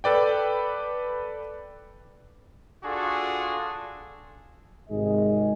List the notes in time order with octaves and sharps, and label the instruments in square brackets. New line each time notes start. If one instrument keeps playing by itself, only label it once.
[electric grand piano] A4 B4 D5 G5
[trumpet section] D4 F4 F#4 G#4 A4
[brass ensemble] G#1 G#2 C3 G#3 G#4 D#5